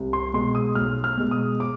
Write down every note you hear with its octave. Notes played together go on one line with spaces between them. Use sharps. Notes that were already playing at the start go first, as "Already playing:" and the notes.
Already playing: C2
C6
B2 G#3 C6
D#6
B1 F6
F6
B2 G#3
D#6
D6